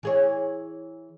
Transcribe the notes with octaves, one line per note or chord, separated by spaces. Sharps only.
E3 G#4 C#5